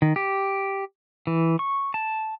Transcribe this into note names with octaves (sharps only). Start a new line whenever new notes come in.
D#3
G4
E3
C#6
A5